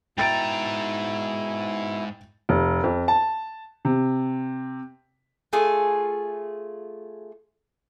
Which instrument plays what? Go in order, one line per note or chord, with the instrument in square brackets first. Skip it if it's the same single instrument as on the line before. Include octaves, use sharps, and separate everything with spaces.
[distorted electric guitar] G#2 A#5 [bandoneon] B2 E4 [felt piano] G5 A6 D7
[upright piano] F1
F2
A5
C3
[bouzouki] A3 F4 G#4